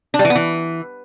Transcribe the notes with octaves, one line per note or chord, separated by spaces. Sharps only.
D4
G3
E3
B3
E3